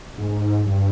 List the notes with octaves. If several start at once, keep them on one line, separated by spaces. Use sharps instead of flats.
G#2
G2